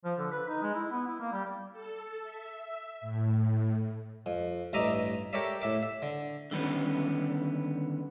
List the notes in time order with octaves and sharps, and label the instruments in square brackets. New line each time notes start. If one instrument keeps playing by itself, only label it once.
[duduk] F3
D3
B4
D#4
G#3
E4
B3
E4
A#3
G3
[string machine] A4
E5
A2
[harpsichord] F2
A1 G2 D#5 E5 A#5 D6
G4 A4 A#4 C#5 D5 E5
A2 E5 D6
E5
D3
[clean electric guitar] D3 D#3 G3 B3 C#4